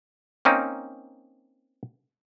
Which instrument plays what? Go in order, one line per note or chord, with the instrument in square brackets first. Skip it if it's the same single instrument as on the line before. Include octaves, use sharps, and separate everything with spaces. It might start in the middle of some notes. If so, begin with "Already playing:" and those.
[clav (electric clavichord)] A#3 C4 C#4 D#4